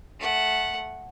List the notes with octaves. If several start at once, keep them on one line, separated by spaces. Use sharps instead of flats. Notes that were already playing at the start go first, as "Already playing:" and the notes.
A3 F#5